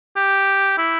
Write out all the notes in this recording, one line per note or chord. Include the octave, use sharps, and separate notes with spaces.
G4
E4